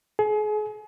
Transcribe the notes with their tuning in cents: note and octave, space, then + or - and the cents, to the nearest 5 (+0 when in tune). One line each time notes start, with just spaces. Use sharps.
G#4 +35